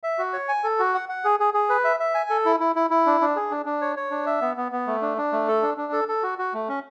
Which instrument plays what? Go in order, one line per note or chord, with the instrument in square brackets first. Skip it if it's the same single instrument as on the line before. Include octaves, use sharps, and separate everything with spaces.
[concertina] E5
F#4
C#5
G#5
A4
F#4
F#5
F#5
G#4
G#4
G#4
B4
E5
E5
G#5
A4
E4
E4
E4
E4
D4
D4
G#4
D4
D4
C#5
C#5
D4
E5
B3
B3
B3
A3
D4
D4
A3
A4
D4
D4
A4
A4
F#4
F#4
A3
C#4